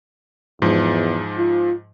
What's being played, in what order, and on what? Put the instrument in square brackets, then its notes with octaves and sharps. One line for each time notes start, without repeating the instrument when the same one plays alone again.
[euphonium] E2 [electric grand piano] G#2 F3
[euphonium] F4